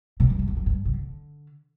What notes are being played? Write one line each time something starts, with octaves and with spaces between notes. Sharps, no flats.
B2
G2
F#2
E2
F#2
G2
C#3
D3